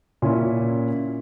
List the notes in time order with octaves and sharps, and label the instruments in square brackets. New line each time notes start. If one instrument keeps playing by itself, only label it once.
[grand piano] A#2 C#4 E4